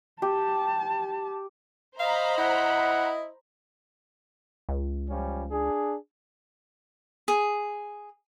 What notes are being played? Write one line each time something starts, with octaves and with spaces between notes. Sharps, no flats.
G4 A5
C5 D#5 F5 A#5 B5
E4 F#5
C#2
F3 G3 C#4
D4 G#4
G#4